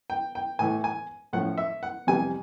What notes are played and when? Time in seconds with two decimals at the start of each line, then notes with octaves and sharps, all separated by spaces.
0.10 G5
0.35 G5
0.59 A2 E3 A3 G#5
0.84 G#5
1.33 A2 F3 A3 C#4 F#5
1.58 E5
1.83 F#5
2.07 F2 C3 E3 G3 G#5